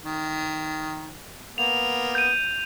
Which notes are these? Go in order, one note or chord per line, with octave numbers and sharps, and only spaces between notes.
D#3
A#3 B3 F7
G6 D#7